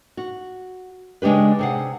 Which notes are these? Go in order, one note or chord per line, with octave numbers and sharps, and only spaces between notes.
F#4
C#3 G#3 D4 G4 B4
C3 G#4 F#5